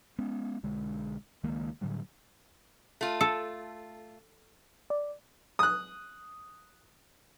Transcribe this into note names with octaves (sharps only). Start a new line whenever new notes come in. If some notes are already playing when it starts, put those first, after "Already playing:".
G#3 B3 C#4
B1 D3 G#3
C#2 D#3 G#3 A#3
A2 D3 F#3 G3
A3 F4
A4
D5
D#6 F#6